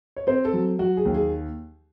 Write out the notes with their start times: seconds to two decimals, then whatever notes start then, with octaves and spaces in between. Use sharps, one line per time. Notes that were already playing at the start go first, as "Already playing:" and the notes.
0.17 C#5
0.27 C4 C5
0.45 A4
0.53 F#3
0.79 F#3 F#4
0.97 G#4
1.05 D#2
1.14 G#4